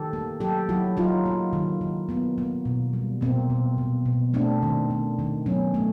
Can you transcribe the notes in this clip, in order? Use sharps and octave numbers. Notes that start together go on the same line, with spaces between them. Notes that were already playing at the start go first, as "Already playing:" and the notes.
Already playing: D#3 G4 A4
A#3
F#3 G4 A4
F#3 E4 F#4
F#3 D#4 F4
A#3
D#3
D#3
A#3 B3
A#3
B2
G3
B2 A#3 C4
B2
B2
B2
A3 C4 D4
D#3
D#3
D#3
F#3 B3 C#4
A3